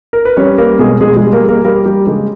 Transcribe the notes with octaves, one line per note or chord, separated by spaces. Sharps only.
A#4
B4
G3 C#4 C#5
G3 A#3 A#4
B2 G#3 G#4
B2 G#3 G#4
G#3 G#4
G3
A#3 A#4
G3
A#3 A#4
G3 A#3 A#4
G3 G4
C#3 G#3 G#4